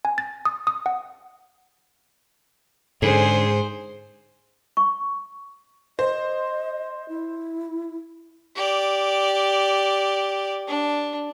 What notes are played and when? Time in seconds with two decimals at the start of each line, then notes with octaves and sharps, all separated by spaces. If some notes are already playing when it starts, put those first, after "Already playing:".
0.05 G#5
0.18 A6
0.45 D#6
0.67 D#6
0.86 F#5
3.02 G#2 D3 C#4 G#4 C5
4.77 C#6
5.99 C5 D#5
7.09 E4
8.56 G4 D5
10.68 D4